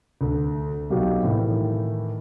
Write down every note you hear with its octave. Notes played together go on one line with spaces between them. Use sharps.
D2
B1 B2 F#3 F#4 G4 F5
A2 D#3 E3